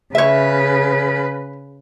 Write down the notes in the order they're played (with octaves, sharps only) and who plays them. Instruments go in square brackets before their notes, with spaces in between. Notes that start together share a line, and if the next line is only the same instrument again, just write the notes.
[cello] C#3 B4 [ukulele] C#5 E5